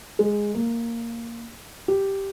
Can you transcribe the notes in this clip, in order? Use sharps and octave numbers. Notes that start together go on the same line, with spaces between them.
G#3
A#3
G4